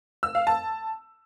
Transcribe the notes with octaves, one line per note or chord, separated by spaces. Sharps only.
E6
F5
A5